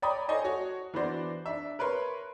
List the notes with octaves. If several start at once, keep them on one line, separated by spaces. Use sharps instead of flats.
C#5 D5 G5 A#5 B5 D#6
A4 C5 C#5 D#5 G#5 A5
F#4 C#5
E3 B3 D4 F#4 C5 D5
D4 E5
A#4 B4 C#5 C6